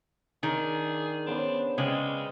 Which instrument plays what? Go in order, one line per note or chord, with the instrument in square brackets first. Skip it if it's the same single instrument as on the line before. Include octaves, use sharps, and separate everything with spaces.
[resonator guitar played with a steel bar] D#3 [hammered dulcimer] D4 [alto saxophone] G#4
[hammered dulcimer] C#3 B3 C5 [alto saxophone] D4
[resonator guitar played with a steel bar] C#3 [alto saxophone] G#3 [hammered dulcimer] D5 G5